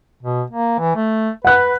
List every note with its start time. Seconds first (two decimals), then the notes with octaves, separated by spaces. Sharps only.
0.23 B2
0.51 A#3
0.79 E3
0.96 A3
1.45 B4 F#5 F#6